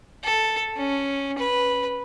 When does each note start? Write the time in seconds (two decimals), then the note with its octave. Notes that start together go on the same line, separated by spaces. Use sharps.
0.24 A4
0.77 C#4
1.38 B4